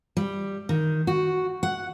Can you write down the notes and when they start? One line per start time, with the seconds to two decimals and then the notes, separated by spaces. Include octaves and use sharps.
0.17 G3
0.69 D#3
1.07 F#4
1.63 F#5